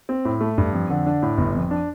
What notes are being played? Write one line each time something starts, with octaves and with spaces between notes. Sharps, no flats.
C4
A2
A3
G2
F2
D3
D4
A2
G1
F2
D4